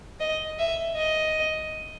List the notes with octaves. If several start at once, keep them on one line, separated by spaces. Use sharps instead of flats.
D#5
E5
D#5